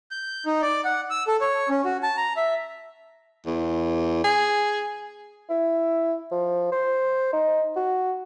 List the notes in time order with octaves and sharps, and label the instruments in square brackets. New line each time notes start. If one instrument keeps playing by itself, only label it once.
[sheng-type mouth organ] G6
D#4
D5
F#5
E6
A4
C#5
C#4
F#4
A5
A#5
E5
[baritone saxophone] E2
G#4
[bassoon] E4
F3
C5
D#4
F#4